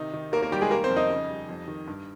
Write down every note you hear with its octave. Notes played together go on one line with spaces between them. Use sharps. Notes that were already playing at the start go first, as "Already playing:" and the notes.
Already playing: C3 D#3 D#4
D#3
D#2 A#3 A#4
A#3 A#4
D#3 G3 G4
G#3 G#4
G3 A#3 A#4
C4 C5
F2
D#4 D#5
C#3
G3
F2
D#3
G2